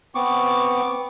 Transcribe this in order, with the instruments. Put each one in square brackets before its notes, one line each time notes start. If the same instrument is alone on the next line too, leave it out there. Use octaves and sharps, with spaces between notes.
[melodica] B3 C4 C#6 D6